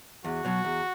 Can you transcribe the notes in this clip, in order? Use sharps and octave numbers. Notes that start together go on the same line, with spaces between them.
E2 F#4
B2 F#3
E2